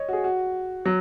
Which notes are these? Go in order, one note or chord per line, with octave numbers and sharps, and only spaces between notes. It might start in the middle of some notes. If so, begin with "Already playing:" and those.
Already playing: C#5 D#5
F#4
G#4
F#4
F#3